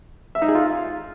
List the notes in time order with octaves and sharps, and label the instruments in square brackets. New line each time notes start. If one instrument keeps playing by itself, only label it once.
[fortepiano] E5
D#4
G#4
F4